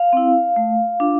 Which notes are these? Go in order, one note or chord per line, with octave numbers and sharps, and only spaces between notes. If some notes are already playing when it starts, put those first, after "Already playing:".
Already playing: F5
C4 E4
A3
D4 F4